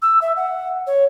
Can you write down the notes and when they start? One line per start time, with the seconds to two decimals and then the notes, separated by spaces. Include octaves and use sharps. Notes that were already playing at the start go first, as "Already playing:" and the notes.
0.02 E6
0.22 E5
0.37 F#5
0.87 C#5